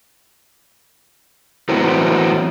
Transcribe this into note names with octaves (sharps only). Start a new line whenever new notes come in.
A2 E3 F#3 B3 C4